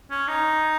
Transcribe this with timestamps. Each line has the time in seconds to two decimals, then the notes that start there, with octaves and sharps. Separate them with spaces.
0.10 C#4
0.28 D#4